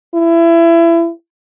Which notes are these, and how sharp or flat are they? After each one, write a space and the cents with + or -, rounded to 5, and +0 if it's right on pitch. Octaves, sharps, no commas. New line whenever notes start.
E4 +25